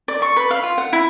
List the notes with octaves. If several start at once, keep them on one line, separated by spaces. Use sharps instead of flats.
D5
C#6
B4
F5
F4
F#5
E4